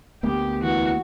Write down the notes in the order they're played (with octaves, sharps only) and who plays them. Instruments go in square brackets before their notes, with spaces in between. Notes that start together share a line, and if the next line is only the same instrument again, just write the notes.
[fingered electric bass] D2 A#3 B3 [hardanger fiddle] G4
[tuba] E3 [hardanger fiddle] F#4